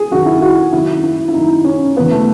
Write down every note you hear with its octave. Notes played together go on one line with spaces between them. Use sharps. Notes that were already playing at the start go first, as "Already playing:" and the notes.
Already playing: G#4
F#2 D#3 F#4
E4
F#4
F#2 D#3 E4
E4
E4
F#2 D#3 D#4
C#4
F#2 C#3 E3 B3
A3